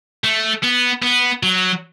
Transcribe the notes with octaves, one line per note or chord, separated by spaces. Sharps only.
A3
B3
B3
F#3